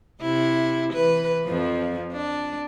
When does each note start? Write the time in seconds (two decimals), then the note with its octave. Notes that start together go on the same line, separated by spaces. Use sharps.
0.22 C3 E4
0.94 E3 B4
1.45 F2 F3
2.13 D4